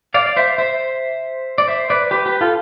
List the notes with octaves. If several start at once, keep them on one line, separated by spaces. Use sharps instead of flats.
D5 F5
D5
C5 E5
C5 E5
D5
C5 E5
B4 D5
G4 B4
G4 B4
F4 A4